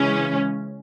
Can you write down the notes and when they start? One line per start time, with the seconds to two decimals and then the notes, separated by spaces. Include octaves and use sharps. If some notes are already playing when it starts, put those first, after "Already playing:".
Already playing: C#3 E3 G#3 C#4